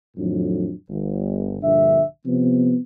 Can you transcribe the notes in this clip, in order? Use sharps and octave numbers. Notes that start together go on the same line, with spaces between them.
F2 A2 D#3 F#3 D4
G1
A#1 G2 D3 E5
C3 F3 B3